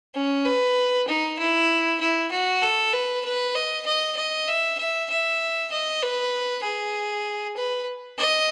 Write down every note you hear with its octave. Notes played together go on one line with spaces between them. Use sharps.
C#4
B4
D#4
E4
E4
F#4
A4
B4
B4
D#5
D#5
D#5
E5
E5
E5
D#5
B4
G#4
B4
D#5